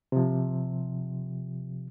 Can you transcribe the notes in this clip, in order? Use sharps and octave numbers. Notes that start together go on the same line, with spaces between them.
C3 F3